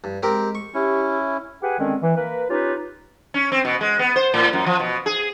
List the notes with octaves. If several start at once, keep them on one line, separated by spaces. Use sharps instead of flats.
G2
G#3 C4 G4 A#4
C#6
C#4 E4 G4
G4 G#4 B4 F#5 G#5
D3 D#3 G#3 C4 C#4
E3
A#3 A#4 B4
C#4 D#4 F4 G4 B4
C#4
C4
B2
G#3
B3
C5
A2
F#2
F3
B2
G#4